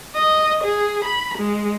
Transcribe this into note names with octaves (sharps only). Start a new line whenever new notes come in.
D#5
G#4
B5
G#3